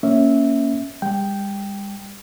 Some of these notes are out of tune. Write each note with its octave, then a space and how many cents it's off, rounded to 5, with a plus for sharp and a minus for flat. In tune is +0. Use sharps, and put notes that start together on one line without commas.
A#3 +0 C#4 +5 E5 -10
G3 +40 G5 +0